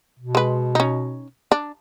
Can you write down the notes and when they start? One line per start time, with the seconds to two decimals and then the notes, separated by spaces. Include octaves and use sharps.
0.19 B2
0.35 G#3 B4
0.75 C#4 D#4
1.52 D4